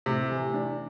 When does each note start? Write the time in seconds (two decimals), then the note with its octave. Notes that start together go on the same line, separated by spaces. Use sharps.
0.06 A2 C3
0.31 E3
0.54 D4